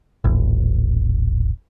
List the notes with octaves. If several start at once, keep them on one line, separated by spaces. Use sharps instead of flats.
D#1 A1